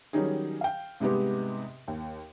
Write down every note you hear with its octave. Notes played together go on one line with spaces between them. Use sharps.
D#3 F#3 G3 C#4 D#4 G#4
F5 G5
G#2 C3 G3 G#3 B3 G4
D#2